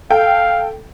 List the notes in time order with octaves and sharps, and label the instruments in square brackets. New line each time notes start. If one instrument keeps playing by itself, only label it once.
[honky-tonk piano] A4 G5 [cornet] F5